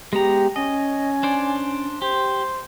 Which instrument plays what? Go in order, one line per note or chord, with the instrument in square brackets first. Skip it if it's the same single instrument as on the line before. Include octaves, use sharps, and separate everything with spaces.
[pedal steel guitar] G#3 B3 A#5 [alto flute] G4
[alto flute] C#4 [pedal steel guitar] D#5 [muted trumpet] G#5
[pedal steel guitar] D4 C5 D5
[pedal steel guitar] G4 [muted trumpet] C5